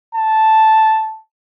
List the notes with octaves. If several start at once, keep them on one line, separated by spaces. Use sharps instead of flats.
A5